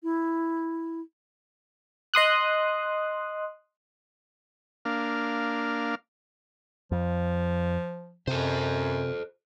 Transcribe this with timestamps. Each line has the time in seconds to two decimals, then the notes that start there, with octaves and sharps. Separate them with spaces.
0.03 E4
2.14 D#5 C6 D#6 F#6
4.85 A#3 D4 F5
6.92 F2 F3
8.27 F#2 C3 A4 C5